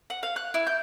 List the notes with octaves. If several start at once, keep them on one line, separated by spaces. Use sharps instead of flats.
F#5
F5
F#6
E4
G6